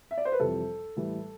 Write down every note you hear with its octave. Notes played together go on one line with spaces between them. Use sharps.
E5
D5
C5
B4
F2 C3 E3 G3 A4
A2 E3 G3